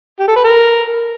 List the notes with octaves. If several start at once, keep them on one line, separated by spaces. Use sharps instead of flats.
G4
A4
B4
A#4